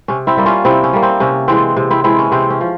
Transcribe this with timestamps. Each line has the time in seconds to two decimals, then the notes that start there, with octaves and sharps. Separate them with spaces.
0.08 C3 C#4
0.27 C4 E4
0.37 G3 A#3
0.46 C#4 F4
0.65 C3 C4 E4
0.84 C#4
0.93 G3 A#3
1.02 C4
1.20 C3 C#4
1.48 E3 G#3 C4
1.76 C3
1.90 C4 E4
2.04 E3 G#3 C4 E4
2.19 C#4
2.32 C3 C4
2.50 C#4
2.61 F3